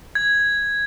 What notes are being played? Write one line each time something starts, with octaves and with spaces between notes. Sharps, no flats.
G#6